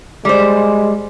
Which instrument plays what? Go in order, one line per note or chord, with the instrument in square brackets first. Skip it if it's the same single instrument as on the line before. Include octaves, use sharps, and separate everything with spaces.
[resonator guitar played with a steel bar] G3 C5 [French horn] G#3